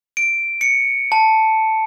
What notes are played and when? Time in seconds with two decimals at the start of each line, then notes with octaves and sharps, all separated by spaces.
0.17 D7
0.61 C#7
1.12 A5